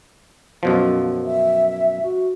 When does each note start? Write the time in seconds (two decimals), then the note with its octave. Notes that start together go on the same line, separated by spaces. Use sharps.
0.63 F#2 B2 F3 F5
1.25 E5
2.03 F#4